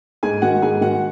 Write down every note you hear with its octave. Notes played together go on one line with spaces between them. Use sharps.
G#2 G#4 G#5
D#3 F#4 F#5
G#2 G#4 G#5
D#3 F#4 F#5